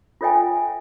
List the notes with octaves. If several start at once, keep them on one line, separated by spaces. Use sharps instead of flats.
F4 A4 C#5 E5 G5 G#5